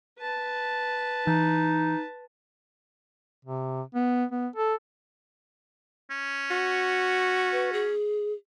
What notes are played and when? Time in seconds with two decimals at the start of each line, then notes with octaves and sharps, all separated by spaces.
0.19 B4 A5
1.27 E3 D#4
3.45 C3
3.95 B3
4.32 B3
4.56 A4
6.10 C#4
6.51 F#4
7.52 B4
7.73 G#4